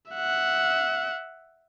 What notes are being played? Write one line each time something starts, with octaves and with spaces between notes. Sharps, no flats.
E5 F#5